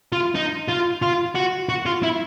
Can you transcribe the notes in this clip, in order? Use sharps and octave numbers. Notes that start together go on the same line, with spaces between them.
F4
D#4
F4
F4
F#4
F#4
F4
E4